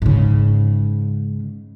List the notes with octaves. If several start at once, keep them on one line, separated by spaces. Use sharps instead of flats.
G#2 C#3